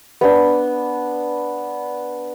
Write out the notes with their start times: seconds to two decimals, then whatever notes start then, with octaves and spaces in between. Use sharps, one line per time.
0.21 B3 D4